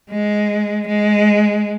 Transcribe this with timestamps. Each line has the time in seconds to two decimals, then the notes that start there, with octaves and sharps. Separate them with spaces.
0.10 G#3
0.87 G#3